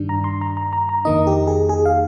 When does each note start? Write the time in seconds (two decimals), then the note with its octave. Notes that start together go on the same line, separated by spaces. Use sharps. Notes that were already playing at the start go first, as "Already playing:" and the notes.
Already playing: G2 D#3 G3 D4
0.09 A#5
0.24 C6
0.41 A#5
0.57 A#5
0.73 A#5
0.89 A#5
1.05 F2 D#3 A#3 D#4 D#5
1.27 G4
1.47 G#4
1.69 G#4
1.85 F5